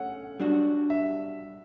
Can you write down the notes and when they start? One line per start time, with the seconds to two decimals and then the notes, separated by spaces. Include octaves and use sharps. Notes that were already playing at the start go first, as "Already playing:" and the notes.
Already playing: A3 C#4 C#5 F#5
0.40 G3 D4 F#4
0.90 E5